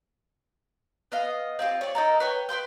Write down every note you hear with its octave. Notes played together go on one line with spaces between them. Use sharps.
B3 D#5 F5
C4 F4 G4
C#5 D5
D#4 A4 A#4
B4 C#5 G5
B4 G5 C6 G6